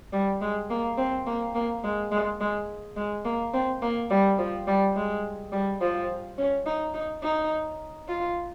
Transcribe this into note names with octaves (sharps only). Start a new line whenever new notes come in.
G3
G#3
A#3
C4
A#3
A#3
G#3
G#3
G#3
G#3
A#3
C4
A#3
G3
F3
G3
G#3
G3
F3
C#4
D#4
D#4
D#4
F4